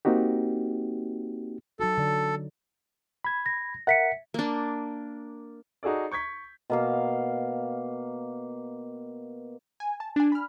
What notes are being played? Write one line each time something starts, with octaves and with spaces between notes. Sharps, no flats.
A#3 C4 D#4 F#4 G4
F#3 D#4 F#4 A4
D3 D5
B5 G#6
A#6
A#4 E5 F#5 B6 C#7
A#3 D4
D#4 F#4 G#4 A4 D5
C#6 G6 G#6 B6
B2 A#3 F5
G#5
A5
D4 G#5
B5 F6